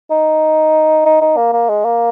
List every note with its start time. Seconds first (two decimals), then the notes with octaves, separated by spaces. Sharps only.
0.11 D#4
1.06 D#4
1.21 D#4
1.37 A#3
1.53 A#3
1.69 G#3
1.85 A#3